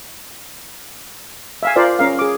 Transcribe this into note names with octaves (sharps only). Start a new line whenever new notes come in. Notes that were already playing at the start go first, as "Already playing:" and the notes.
E5 F5 G#5
F4 A#4 C5 D5 F5
C#4 A#4 F5
G#4 D6